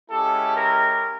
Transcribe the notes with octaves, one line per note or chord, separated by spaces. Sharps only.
G#3 C#4 E4 G4 A4
A#4